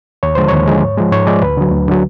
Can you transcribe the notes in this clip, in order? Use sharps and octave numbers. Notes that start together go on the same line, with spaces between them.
D#2 C#5
D3 F3 G#3 C5
D#2 C#5
D3 F3 G#3
G#2
F3 G#3
G#2 C#5
F3 G#3 D5
D2 B4
D3 F#3
D2
D3 F#3